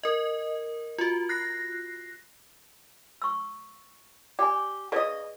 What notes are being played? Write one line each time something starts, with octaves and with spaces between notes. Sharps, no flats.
A#4 D#5
F4 F#4
F#6 A#6 C7
C#6 E6
G4 D5 G#5
C#3 F#4 G#4 B4 D5 D#5